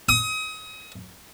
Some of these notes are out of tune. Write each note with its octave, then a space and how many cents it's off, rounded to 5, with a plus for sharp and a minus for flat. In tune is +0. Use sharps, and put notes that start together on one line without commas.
D#6 +30